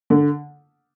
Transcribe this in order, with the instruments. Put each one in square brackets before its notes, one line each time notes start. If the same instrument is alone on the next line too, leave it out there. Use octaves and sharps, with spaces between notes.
[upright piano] D3